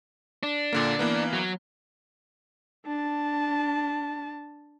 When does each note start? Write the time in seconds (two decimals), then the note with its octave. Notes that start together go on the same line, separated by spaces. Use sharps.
0.43 D4
0.73 A#2 D3 A#3
0.99 E3 A#3 B3
1.33 F#3
2.86 D4 A5